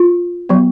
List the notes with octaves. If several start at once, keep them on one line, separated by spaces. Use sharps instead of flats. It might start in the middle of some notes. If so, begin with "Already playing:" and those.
Already playing: F4
F#3 B3